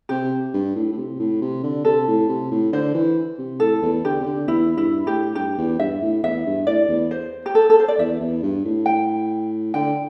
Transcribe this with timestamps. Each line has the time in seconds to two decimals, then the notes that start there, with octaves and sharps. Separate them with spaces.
0.09 C3 G4
0.54 G2
0.75 A2
0.92 A2
0.97 C3
1.19 A2
1.41 C3
1.63 D3
1.85 C3 A4
2.07 A2
2.28 C3
2.51 A2
2.72 D3 C5
2.94 E3
3.38 C3
3.60 A2 A4
3.82 E2
4.05 D3 G4
4.20 C3
4.26 D3
4.48 E2 E4
4.77 G2 E4
5.06 A2 G4
5.35 G2 G4
5.58 E2
5.79 G2 E5
6.02 A2
6.23 E2 E5
6.46 G2
6.67 A2 D5
6.89 E2
7.11 C5
7.46 G4
7.55 A4
7.70 A4
7.80 C5
7.88 D5
7.98 E2 E5
8.20 E2
8.43 G2
8.65 A2
8.86 G5
9.74 D3 G5